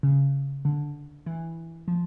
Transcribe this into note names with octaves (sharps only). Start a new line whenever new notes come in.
C#3
D3
E3
F3